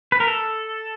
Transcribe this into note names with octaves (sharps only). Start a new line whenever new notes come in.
B4
A#4
A4